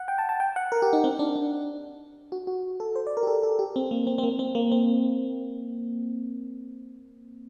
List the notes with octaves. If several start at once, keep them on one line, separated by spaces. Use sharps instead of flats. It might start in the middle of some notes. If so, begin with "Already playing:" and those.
Already playing: F#5
G5
A5
A5
G5
F#5
A#4
G4
D#4
C4
D4
D4
F#4
F#4
A4
C5
D5
A#4
G4
A4
A4
G4
C4
A#3
C4
C4
A#3
C4
A#3
C4